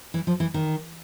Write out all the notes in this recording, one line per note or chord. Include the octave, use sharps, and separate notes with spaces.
E3
F3
E3
D#3